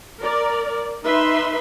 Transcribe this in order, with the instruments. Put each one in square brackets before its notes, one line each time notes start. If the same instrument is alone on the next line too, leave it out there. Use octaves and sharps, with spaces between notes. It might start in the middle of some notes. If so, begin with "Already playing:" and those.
[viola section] A#4 D5
D#4 B4 E5 C6